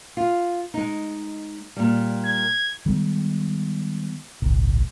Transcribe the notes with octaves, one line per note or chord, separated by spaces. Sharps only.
F4
G#3 D#4
A#2 G3
G#6
D#3 G3 G#3 B3
G#1 C#2 A#2